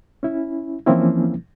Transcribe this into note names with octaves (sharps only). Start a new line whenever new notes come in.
C#4 E4
E3 F3 A#3 C4 C#4 E4